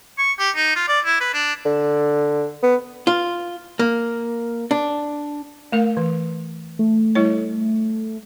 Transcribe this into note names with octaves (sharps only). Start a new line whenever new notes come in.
C#6
G4
D#4
F4
D5
E4
B4
D4
D3
B3
F4
A#3
D4
A3 A#4 F5
E3
A3
G3 E4 C#5